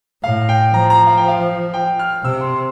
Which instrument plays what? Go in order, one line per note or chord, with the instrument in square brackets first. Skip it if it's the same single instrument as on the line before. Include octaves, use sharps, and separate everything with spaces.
[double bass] A2 [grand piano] F5
[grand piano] G5
[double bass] F3 [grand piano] A#5
[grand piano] A#5
F5
G5
F5
G5
F6
[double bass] C3 [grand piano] E6
[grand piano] C6